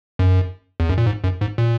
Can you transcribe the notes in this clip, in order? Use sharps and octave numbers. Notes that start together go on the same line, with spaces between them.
F#2
E2
F#2
A#2
G#2
F#2
G#2
A#2